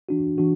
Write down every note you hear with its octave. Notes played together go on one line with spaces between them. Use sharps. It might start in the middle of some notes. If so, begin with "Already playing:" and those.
E3 D4 F#4
E3 D4 F#4